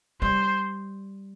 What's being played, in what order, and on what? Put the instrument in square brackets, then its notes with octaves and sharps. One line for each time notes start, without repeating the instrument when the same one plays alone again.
[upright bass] G3 [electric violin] C5